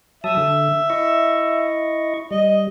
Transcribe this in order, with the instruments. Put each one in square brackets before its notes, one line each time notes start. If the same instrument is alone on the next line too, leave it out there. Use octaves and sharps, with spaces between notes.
[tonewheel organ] F#3 A5 D#6 [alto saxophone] E5
[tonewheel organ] D3
E4 D#5 C#6
[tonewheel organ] G3 [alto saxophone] D#5